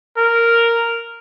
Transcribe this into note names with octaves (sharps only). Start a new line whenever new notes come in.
A#4